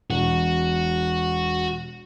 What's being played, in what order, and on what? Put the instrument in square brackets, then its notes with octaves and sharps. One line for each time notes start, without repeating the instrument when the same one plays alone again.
[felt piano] E1 [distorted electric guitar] F#4